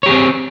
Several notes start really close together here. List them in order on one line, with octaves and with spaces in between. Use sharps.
C#5 G4 G#4 C4